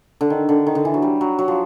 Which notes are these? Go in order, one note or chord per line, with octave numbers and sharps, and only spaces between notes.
D3
D#3
D3
D#3
D3
E3
F#3
G3
F#3
F#3
F3